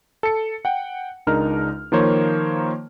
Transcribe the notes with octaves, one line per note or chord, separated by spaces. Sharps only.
A4 C#7
F#5 G5
C#2 G#3 D4 D#4 A#4 F6
D#3 F3 A#3 A#4 C5 C#5